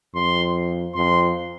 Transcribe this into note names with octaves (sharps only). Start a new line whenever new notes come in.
F2 C6
F2 C6